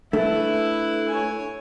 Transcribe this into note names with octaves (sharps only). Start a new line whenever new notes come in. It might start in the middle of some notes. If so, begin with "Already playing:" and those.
A3 D4 E4 B4
C#5 G#5